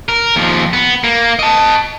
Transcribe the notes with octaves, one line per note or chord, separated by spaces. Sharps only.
A#4
D#2 F3
B3
A#3
D#5 A5